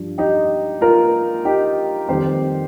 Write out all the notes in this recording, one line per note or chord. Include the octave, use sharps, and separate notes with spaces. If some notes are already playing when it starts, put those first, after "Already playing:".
Already playing: G2 F3
D#4 G4
F4 A#4
D#4 G4
F2 D#3 G3 G4 C5